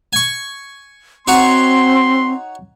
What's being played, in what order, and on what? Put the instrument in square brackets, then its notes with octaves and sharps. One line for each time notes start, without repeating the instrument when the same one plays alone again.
[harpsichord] G#5 C#6
[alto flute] C4 [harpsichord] D#4 F#4 C#5 [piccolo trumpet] C6